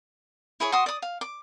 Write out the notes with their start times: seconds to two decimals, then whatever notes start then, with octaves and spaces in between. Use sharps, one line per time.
0.60 E4 G#4 C#5
0.72 F#4 C6 D#6
0.86 D5 D#6
1.02 F5
1.21 D6